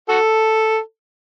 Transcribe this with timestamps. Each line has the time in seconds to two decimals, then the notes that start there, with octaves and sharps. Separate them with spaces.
0.09 F#4 A4